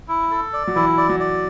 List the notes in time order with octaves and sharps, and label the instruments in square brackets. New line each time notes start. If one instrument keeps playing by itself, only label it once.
[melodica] E4
A4
D5
[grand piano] F#3
[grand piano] E3 [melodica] E4
[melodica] D5
[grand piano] F#3
[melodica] D5